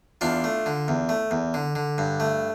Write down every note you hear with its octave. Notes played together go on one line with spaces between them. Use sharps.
E2 D4 F4
A3
D3
E2
A3
E2
D3
D3
G2
A3